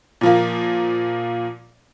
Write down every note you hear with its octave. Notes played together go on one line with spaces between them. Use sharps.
A#2 F3 A#3